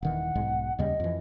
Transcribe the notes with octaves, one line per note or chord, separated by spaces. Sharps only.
D#1 D#3 E3 F#5
B1 G#2 G#3
D#2 C#3 G3 D#5
F2 E3